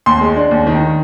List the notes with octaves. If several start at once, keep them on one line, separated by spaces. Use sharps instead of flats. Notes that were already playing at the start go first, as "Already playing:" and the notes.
D#2 C6
G#3
D4
D#2
D#3